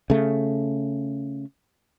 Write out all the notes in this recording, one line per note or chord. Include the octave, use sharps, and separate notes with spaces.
C#3 A3